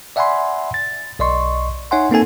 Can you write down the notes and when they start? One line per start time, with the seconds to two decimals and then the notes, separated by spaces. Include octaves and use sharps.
0.16 D5 E5 F#5 G#5 B5 C6
0.74 A6
1.19 B1 D5 D#5 C6 C#6
1.91 D#4 C#5 E5 F#5 G#5 C6
2.11 A#3 C4 D#4 A4 G#5